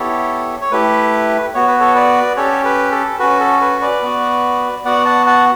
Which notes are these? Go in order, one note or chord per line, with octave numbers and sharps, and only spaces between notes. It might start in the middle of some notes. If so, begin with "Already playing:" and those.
Already playing: B3 E4 G4 A4 C#5
C#5
A3 E4 G4 B4
B3 F#4 C#5
B4
A4 C#5
B4 D5
C#4 G4 A4 C#5
B4
A4
C#4 F#4 B4
A4
B4
B4 D5
B3 F#4
B3 F#4 D5 F#5
F#5 A5
F#5 A5